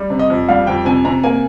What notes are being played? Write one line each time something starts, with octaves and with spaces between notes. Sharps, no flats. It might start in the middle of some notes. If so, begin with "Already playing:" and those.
Already playing: G3
C3
D#5
F2
G3 F5
F2 G5
C3 G#5
C3 A#5
A#3 G#5